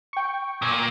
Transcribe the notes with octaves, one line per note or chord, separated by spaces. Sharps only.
G5 C#6
A#2